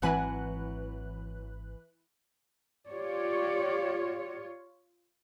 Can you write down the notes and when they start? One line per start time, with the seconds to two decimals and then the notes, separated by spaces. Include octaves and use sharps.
0.02 G#1 E3 F#3 C4 B4 F#5 G#5 F#6
2.90 F4 G4 C#5 D5